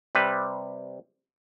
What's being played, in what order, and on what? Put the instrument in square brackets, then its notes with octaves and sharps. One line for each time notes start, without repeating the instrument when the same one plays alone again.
[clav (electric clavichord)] C3 G3 B4